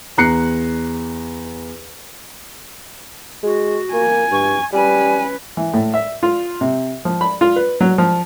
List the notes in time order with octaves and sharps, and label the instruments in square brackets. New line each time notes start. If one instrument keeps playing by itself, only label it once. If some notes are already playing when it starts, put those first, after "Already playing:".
[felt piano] E2 A#5 F#6 C7 C#7
[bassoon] G#3 [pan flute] F#4
[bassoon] A#3 [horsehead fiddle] G#5
[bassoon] G2 [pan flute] C#6
[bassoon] G3 [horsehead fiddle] C#4 B4 [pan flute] G#5
[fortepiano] E3
A2
E5
F4
C3
F3
B5
F4
B4
F#3
F3